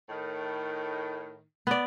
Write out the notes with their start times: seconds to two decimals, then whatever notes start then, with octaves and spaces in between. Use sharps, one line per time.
0.09 A2 D#3
1.67 B3 D5